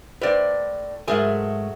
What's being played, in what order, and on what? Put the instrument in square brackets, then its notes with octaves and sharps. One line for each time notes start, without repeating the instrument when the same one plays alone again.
[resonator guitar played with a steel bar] A2 D5 [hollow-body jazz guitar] B4 C5
[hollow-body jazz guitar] G#2 A#4 G#5 [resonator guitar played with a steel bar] F#3 A3 G#4